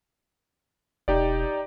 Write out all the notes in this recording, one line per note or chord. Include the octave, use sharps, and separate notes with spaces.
E1 D#4 G4 D5